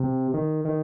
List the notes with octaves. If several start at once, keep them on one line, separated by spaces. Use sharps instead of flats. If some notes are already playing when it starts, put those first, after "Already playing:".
Already playing: C3
D#3
D#3